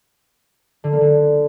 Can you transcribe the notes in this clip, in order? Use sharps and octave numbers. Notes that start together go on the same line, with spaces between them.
D3
A#3
D3